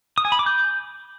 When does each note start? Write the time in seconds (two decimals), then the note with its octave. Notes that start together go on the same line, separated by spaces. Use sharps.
0.18 D#6
0.25 G#5
0.32 B5
0.39 D6
0.46 G6